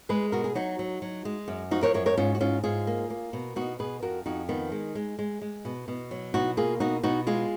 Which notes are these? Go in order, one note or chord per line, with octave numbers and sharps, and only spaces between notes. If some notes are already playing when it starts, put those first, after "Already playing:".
G#3 G#4 B4
B2 F#4 A#4
G#4
F#3 D#4 F#4
F#3
F#3
G#3
F#2
F3 D#4 F#4
A#4 C#5
F#2 A#4 C#5
A#4 C#5
G#2 C#4 F4
F#4
G#2 C#4 F4
G#2 F4 G#4
A#3
A#3
B2
B2 D#4 F#4
B2 G#4 B4
F2 F#4 A#4
F2 D#4 F#4
D#3 B3 D#4
G#3
G#3
G#3
G#3
B2
B2
F#3
B2 D#4 F#4
A#3 F4 G#4
B2 D#4 F#4
B2 D#4 F#4
G#3 F4 G#4